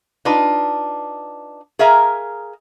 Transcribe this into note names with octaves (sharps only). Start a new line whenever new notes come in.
D4 D#4 F4 B4
G#4 A#4 E5 F5 G#5 A#5